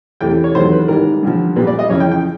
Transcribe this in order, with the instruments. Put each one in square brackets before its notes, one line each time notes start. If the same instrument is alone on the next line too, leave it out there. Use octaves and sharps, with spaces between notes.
[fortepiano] E2 C3 E3 A3 G5
C#5
E2 C3 D#3 F#3 A3 C5
B4
G#2 D#3 G3 A#4
G2 D3 F3
A#2 G3 B3 B4
D5
D#5
F2 C#3 E3 C#5
G5
G5